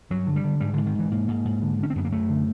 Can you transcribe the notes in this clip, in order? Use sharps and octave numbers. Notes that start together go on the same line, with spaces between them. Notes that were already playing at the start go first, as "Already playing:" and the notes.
G2 F#3
D3
G3
D3
G#2 G3
D3
G#2
D#3
G#2 E3
G#2 A#3
G#2
G#2
D3
D3 C#4
C4
F#2 B3
A#3
F#2 A3
D3